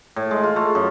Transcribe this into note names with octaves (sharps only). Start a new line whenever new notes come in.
A2
G#3
F4
A3
F#2